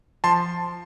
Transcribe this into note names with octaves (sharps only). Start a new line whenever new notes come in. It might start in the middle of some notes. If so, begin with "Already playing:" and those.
F3 A5 C6